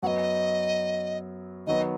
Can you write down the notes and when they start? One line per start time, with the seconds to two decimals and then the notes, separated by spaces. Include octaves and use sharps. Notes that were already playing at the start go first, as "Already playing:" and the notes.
0.03 F#2 F#3 B3 D#5 F#5
1.67 D#3 F#3 B3 D#5